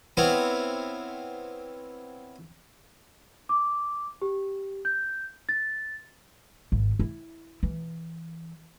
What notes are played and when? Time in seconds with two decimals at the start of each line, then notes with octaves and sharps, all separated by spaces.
0.17 B3 C4 E4 C#5 F5
3.49 D6
4.22 G4
4.85 G6
5.49 A6
6.72 G#1
6.99 E4
7.63 E3